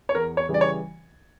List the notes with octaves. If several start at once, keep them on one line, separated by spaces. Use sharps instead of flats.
C#5
E2 A#4
C#5
C#3 E3 G3
D5
C#5